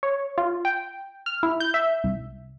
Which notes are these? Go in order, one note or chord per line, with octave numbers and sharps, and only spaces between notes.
C#5
F4
G5
F6
E4
G6
E5
C2